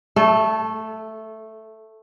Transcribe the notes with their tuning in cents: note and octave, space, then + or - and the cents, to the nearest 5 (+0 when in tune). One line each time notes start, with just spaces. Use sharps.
A3 +0 A4 -30